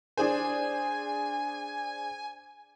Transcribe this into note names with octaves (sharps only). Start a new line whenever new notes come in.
D4 G#4 C5 G#5